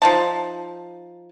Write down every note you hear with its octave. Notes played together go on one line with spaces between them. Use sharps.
F3 D#4 A5